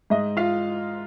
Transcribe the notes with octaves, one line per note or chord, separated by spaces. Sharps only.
G#2 D#5
F4 F5